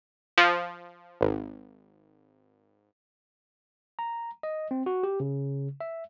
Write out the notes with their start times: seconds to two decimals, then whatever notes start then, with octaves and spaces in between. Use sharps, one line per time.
0.38 F3
1.21 G#1
3.99 A#5
4.43 D#5
4.71 C4
4.86 F#4
5.03 G4
5.20 C#3
5.81 E5